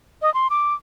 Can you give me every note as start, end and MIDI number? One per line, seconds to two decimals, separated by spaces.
0.22 0.32 75
0.34 0.48 84
0.50 0.74 86